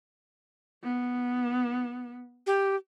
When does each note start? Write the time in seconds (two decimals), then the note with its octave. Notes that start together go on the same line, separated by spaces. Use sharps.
0.83 B3
2.47 G4